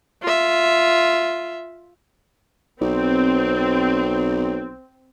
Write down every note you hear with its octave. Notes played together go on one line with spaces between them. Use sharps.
F4 E5
B1 C4